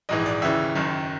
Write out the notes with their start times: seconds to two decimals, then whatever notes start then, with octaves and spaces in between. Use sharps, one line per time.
0.09 A#1 G#2 E3 D#5
0.26 D5
0.42 D#2 C#3 E3 E5
0.75 F#1 F#2 D#3